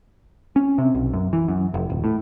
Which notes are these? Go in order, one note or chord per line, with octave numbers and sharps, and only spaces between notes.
C#4
C3
B1
F#2
E3
F#2
F1
D#1
A2